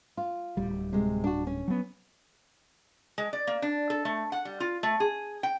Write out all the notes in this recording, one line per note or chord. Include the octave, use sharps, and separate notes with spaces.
F4
D1 G3
C3 G#3
D4 F#4
C#4
F#3 B3
G#3
D5
A#3
D4
A4
A3
F#5
G3
F4
A3
G#4
G5